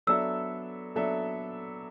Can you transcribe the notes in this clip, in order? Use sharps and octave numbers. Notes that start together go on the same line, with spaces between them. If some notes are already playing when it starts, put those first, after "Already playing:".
F#3 B3 D4 A4 E5 E6
F#3 B3 D4 A4 E5